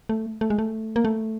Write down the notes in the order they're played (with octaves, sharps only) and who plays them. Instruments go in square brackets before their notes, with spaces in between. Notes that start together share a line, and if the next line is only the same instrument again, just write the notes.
[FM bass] A3
A3
G#3
A3
A#3
A3